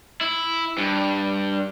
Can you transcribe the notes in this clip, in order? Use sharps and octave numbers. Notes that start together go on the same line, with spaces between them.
E4
G2